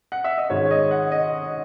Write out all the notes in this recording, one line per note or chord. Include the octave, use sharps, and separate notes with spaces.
F#5
E5
D#5
G#2 D#3 G#3 C#4 C#5
C#5
D#5
F#5
D#5